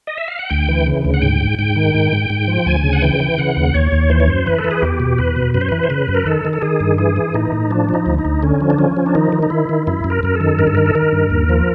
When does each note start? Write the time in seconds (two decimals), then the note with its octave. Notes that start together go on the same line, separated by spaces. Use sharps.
0.07 D#5
0.18 E5
0.28 F5
0.39 F#5
0.50 D2 G5
0.69 E3
0.86 C#3
1.05 D2
1.14 F#5
1.22 G#2 G5
1.41 G#2
1.59 G#2 G5
1.76 D#3
1.95 G#2
2.12 G#2
2.30 G#2
2.48 F3
2.66 D2 G#5
2.84 C#3
2.93 F#5
3.02 E3 G5
3.20 E3
3.38 C#3 F#5
3.57 D#2
3.74 D#2 C#5
3.92 D#2
4.10 E3 C5
4.20 C#5
4.28 F#2 C5
4.46 E3 B4
4.58 A4
4.64 E3
4.71 G#4
4.82 E2 G4
5.00 B2
5.18 E2 B4
5.36 B2
5.54 F#2 B4
5.61 C5
5.69 E3 B4
5.83 C5
5.90 C#3 B4
6.08 F#2
6.14 A#4
6.26 D#3 A4
6.45 D#3
6.53 A4
6.62 D#3 G#4
6.80 G2
6.98 E3 G#4
7.16 E3
7.34 A2 D#4
7.52 A2
7.71 F3 D4
7.89 F3
7.94 D#4
8.06 D2
8.18 D#4
8.25 D2
8.43 D3 C#4
8.61 F3
8.70 D4
8.78 F3 C#4
8.97 F3
9.06 D4
9.15 D#3 D#4
9.32 D#3
9.43 D#4
9.50 D#3 E4
9.69 D#3
9.87 F#2 E4
10.04 F#2
10.10 A#4
10.23 F#2 A#4
10.35 A4
10.41 D#3
10.59 G2 A#4
10.67 A4
10.75 D#3 A#4
10.86 A4
10.95 D#3 A#4
11.13 G2
11.30 D#2
11.49 F3